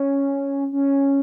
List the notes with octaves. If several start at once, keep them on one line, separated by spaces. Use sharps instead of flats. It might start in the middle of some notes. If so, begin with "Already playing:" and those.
Already playing: C#4
C#4